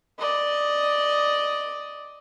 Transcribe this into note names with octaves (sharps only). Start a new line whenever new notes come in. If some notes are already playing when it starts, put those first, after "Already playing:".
D5 D#5